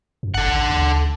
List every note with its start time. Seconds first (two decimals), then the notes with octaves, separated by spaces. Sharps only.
0.23 F#2
0.34 F1 A4 F#5
0.47 A1
0.69 D2